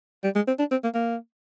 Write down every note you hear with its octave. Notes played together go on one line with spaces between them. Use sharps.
G3
G#3
C4
D4
C4
A#3
A#3